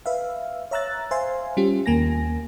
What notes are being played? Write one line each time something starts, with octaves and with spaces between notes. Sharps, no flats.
B4 E5 F5
C#5 E5 A#5 E6 F#6 A6
C5 E5 F5 G#5 C6
G3 C#4 F4 G4
D#2 A#3 G#5 A#6